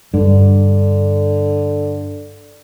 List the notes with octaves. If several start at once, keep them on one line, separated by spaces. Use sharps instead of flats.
G2 D3